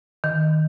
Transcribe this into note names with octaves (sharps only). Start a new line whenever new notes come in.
D#3